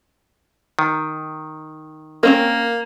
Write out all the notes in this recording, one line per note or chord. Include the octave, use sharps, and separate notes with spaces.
D#3
A#3 C4 C#4 A#4